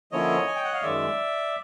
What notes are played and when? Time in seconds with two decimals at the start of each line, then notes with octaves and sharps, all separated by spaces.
0.12 D3 F3 A#3 C#4 E4 C#5 D#5
0.47 G#5
0.56 G5
0.64 F#5
0.73 F5
0.82 F#2 D#3 G#3 D5 E5